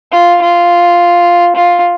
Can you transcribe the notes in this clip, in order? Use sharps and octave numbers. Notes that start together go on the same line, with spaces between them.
F4
F4
F4